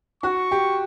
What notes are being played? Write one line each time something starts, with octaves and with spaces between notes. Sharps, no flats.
F#4 C#6
G4